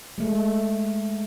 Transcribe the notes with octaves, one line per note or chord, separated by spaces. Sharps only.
G#3 A3